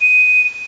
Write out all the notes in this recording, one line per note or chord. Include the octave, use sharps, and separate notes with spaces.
D#7